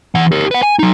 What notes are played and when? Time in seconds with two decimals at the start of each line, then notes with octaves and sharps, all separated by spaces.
0.15 E3 F#5
0.32 G4 A#4
0.51 B4 F#5
0.63 G#5
0.79 F#3 D#4